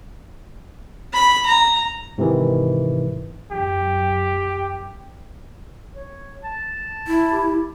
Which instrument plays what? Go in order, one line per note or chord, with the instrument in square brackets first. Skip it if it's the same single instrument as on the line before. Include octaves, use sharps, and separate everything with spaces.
[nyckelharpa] B5
A#5
[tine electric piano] G#2 C3 D#3 E3
[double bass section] F#2 [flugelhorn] G4
[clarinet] C#5
A5
[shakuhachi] E4
[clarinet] G4